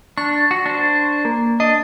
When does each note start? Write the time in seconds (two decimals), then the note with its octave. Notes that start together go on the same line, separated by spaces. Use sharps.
0.18 D4 C#6
0.51 F#4
0.66 D4 C5
1.25 A#3
1.60 D4 D#5